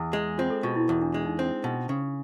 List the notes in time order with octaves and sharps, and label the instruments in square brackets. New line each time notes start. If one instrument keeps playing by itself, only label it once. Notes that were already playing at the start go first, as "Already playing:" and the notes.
Already playing: [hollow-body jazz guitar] E2
G#3
[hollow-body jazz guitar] C4 [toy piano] F4
[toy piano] A4
[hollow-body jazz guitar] B2 [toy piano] F4
[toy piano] E4
[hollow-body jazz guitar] E2 [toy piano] E4
[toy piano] D4
[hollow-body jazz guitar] G#3 [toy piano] D4
[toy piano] D#4
[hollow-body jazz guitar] C4
B2
C#3